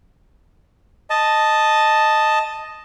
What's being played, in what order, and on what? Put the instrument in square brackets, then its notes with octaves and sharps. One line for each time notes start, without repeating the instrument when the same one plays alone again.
[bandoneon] D#5 A5